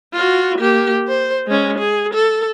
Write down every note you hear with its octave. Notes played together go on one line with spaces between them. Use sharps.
F4 F#4
A#3 G4
C5
G#3 C#4
G#4
A4